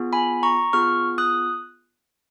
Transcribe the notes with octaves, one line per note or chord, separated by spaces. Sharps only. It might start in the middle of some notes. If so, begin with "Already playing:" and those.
Already playing: B3 F4 G#4
G#5 B5
A#5 C#6
B3 F4 G#4 C#6 F6
D#6 F#6